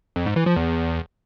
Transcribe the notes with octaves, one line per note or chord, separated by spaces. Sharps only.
F2
G#2
E3
F3
E2